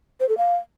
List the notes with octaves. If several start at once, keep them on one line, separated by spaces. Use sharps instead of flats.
C5
A4
F5